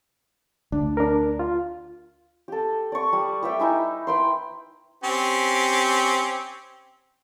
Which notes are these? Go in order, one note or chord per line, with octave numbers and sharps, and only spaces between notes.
D2 D4
D4 A#4
F4
G4 A4
D5 C#6
G3
G4 B4 E5 G5
D#4 E4 G#5
B4 G5 C6
C4 C#4 G4